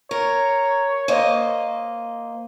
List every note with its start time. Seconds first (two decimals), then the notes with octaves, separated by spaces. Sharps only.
0.11 A#4 C#5
1.08 A#3 C5 D#5